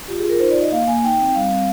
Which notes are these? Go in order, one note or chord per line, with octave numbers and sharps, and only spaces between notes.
F4 G4
G#4
F4
A#4
D#4 C5
D5
D#4
D#5
A#3 F5
A#3 G#5
D#4 G5
C4
G3 F5
C4